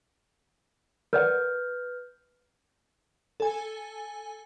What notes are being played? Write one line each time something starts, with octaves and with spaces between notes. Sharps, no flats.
A#4 B4 D5 F#5 F6 G6
A4 G#5